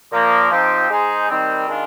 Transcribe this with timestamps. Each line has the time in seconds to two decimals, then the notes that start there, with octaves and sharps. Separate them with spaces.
0.12 A#2 F3 A#3
0.51 F3 C4 D#4 G4
0.90 G#3 D#4 G#4 C5
1.29 D#3 G3 C4
1.68 D#3 G#3 D4 F4